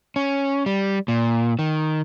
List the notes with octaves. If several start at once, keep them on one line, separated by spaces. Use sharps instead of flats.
C#4
G3
A#2
D#3